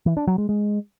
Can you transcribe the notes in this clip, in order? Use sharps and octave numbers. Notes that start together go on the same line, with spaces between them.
E3
D4
F#3
G#3
G#3